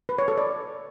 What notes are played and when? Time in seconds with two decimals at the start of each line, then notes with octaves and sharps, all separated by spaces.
0.09 B4
0.18 C#5
0.28 A4
0.38 D5